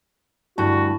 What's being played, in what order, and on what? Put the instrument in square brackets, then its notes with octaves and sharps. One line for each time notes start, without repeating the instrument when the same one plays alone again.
[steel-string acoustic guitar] D2 G2 [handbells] E4 A5 [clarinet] F#4